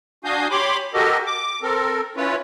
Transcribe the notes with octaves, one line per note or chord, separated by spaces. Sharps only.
D4 F#4 F5 G#5 D#6 G6
G4 C#5 B5 C6 D6
F#4 G4 A4 A#4 D#5
D6
C4 A4 A#4
C#4 E4 F4 B4 C#5